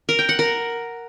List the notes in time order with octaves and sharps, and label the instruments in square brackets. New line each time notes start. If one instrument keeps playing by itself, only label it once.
[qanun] A#4
G5
F#5
A#4